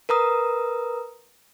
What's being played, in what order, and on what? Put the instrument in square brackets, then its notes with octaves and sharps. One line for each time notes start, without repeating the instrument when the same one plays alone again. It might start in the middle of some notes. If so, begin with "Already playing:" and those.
[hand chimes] A#4 B4 A#5 D#6